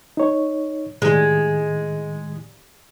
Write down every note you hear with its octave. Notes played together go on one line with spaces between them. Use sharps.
D#4 C#5
A2 D#3 G#3 E4